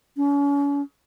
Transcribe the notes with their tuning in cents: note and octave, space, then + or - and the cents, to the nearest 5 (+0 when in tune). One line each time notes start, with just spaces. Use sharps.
C#4 +40